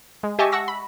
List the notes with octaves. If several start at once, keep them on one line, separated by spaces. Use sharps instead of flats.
G#3
G4 D#5 E5 G#5 A5 C#6
F#5 C#6 E6 A#6
B5